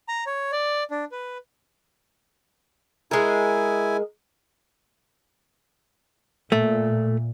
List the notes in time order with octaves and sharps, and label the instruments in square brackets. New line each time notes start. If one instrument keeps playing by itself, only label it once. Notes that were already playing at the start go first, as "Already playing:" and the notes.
[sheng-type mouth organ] A#5
C#5
D5
D4
B4
[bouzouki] G#3 A#4 [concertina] E4 G#5
[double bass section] A#2 [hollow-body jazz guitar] A3